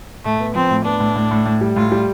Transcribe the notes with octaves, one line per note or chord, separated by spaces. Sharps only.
A2 A3
B3
F3 C4
A2
B3 D4
A2
A2
A2
A2
G3
A2 F4
G3